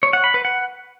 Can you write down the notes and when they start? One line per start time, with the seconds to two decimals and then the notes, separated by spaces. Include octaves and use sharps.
0.03 C#5
0.13 F#5
0.24 B5
0.34 B4
0.45 F#5